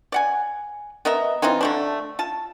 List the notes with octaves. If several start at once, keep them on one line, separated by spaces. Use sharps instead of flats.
D5 F#5 G#5
B3 A#4 D#5 E5
E3 C4 D#4 F4
D3 A3 D4
F4 A5